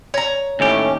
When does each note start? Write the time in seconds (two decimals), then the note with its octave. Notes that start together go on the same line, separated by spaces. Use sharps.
0.14 C#5 A#5
0.60 D#2 A2 C#4 G4